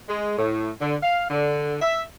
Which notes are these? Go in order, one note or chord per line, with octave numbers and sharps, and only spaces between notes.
G#3
A2
D3
F5
D3
E5